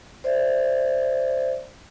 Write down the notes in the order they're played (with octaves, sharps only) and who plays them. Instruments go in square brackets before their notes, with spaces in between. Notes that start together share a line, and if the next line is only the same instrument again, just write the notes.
[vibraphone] C5 D5 E5